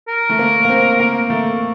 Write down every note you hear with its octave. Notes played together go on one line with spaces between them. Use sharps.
A#4
A3
A#3
A#3
C4
A#3
A3